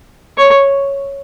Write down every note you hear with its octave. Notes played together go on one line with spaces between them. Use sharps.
C#5